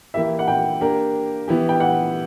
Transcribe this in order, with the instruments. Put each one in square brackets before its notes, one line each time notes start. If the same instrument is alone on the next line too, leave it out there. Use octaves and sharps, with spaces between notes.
[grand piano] E3 A#3 E4 G4 [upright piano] E5
[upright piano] F#5
G5
[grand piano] A#3 D4 G4 A#4
E3 B3 E4 G4
[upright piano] G5
F#5